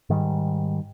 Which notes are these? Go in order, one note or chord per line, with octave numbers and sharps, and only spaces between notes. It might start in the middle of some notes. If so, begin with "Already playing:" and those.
G#2 D#3 G3